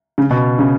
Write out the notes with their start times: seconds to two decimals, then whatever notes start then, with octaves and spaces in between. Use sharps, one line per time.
0.18 C#3
0.31 B2
0.59 C#3